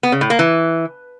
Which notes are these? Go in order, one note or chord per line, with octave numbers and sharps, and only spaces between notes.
B3
C#3
A2
A#3
E3